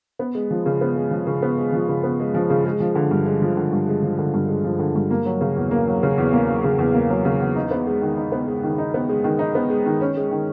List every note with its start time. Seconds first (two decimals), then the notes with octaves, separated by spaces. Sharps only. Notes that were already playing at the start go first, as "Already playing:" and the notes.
0.19 B3
0.35 G#3
0.51 F3
0.66 C#3
0.81 B3
0.96 G#3
1.11 F3
1.27 C#3
1.42 B3
1.57 G#3
1.73 F3
1.88 C#3
2.03 B3
2.19 G#3
2.34 F3
2.50 C#3
2.65 G#3
2.80 F3
2.95 D3
3.11 G2
3.26 G#3
3.42 F3
3.57 D3
3.72 G2
3.88 G#3
4.03 F3
4.19 D3
4.34 G2
4.49 G#3
4.64 F3
4.79 D3
4.95 G2
5.10 A#3
5.25 F#3
5.41 C#3
5.56 E2
5.71 A#3
5.87 F#3
6.03 C#3
6.18 E2
6.33 A#3
6.48 F#3
6.64 C#3
6.78 E2
6.94 A#3
7.10 F#3
7.25 C#3
7.40 E2
7.56 D#4
7.71 B3
7.87 G#3
8.02 D#3
8.17 D#4
8.32 B3
8.47 G#3
8.64 D#3
8.78 D#4
8.94 B3
9.09 G#3
9.24 D#3
9.39 D#4
9.55 B3
9.70 G#3
9.86 D#3
10.01 C#4
10.17 G#3
10.31 D#3